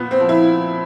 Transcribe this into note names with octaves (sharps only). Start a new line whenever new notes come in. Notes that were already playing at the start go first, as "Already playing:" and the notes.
Already playing: A#2 B3
C4
F3
E4